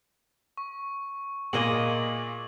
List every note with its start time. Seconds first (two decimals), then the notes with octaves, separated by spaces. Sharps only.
0.57 C#6
1.53 A#2 G#3 A#3 D#5 F#7